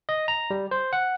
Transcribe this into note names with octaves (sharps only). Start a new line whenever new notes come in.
D#5
A#5
G3
C5
F#5